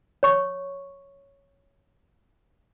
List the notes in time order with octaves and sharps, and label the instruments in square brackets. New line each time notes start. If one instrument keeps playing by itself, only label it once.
[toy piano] C#5 C#6